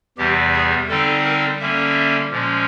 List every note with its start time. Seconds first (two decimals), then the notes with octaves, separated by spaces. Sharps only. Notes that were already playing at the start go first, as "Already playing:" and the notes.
0.18 E2 C3 E3 G3 G4
0.53 G#4
0.89 D3 G3 C4 D#4 A4
1.24 A#4
1.60 D3 G3 A#3 C#4 E5
2.31 A#2 F3 G#3 C#4